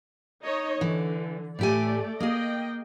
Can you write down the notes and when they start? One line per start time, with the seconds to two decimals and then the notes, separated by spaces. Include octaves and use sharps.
0.44 D#4 C#5 D#5
0.81 D3 E3
1.59 A2 A3 G4 D5 G#5
2.20 A#3 G#4 D#5 G5